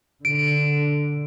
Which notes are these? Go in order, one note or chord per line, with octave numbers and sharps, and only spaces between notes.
D3 D7